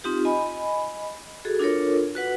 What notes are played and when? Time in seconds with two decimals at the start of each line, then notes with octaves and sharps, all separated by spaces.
0.04 C4 D#4 F4 G4
0.25 D#5 G#5 B5
1.45 F#4 G#4 A4
1.59 D4 F4 A4 A#4 C#5
2.15 F#4 B4 F#5